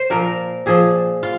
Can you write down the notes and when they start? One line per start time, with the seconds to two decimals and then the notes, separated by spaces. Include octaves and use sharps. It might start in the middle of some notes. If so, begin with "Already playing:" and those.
Already playing: C5
0.10 A#2 F3 A#4
0.66 A#2 F3 G#4
1.23 F4